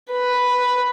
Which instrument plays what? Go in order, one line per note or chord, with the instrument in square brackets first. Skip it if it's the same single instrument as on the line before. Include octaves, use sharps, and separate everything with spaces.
[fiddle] B4